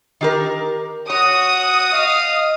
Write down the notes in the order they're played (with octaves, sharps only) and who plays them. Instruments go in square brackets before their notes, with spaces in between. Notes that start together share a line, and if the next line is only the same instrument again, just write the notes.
[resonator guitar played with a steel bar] D#3 G4 A#4
[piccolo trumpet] F#4 [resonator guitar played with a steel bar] C#5 [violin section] D#6
[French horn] D#5 [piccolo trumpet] F5